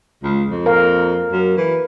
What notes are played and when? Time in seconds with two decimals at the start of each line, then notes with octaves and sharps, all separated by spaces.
0.23 C#2
0.50 F2
0.66 A#4 F5
1.32 F#2
1.57 E3